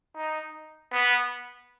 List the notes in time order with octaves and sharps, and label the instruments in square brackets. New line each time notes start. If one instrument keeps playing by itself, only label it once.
[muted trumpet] D#4
B3